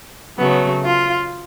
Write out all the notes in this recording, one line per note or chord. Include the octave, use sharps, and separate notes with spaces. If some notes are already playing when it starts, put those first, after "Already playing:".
C#3 F#3 A3 B3
F4